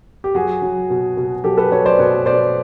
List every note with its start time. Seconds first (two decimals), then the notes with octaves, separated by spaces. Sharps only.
0.24 G4
0.35 F#3 F#4 G#4
0.62 F#3
0.90 B2
1.17 B2
1.44 F#3 G4 A4
1.58 A4 B4
1.71 F#3 B4 C#5
1.86 C5 D5
1.99 B2 B4 C#5
2.26 B2 C5 D5